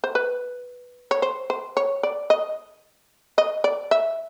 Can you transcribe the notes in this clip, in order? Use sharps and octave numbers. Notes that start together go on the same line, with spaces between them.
C5
B4
C#5
C5
C5
C#5
D5
D#5
D#5
D5
E5